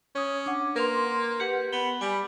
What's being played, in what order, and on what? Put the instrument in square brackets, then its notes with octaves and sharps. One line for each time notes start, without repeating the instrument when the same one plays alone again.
[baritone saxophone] C#4 [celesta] C#5 D#6 G#6
[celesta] D4 F#5 [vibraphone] D6
[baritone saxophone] A#3 [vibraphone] A#4 C6 [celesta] B4 F7
[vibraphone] G4 B4 F#5 [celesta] C#7
[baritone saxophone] B3 [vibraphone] B5 [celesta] G7
[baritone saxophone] G3 [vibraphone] G#5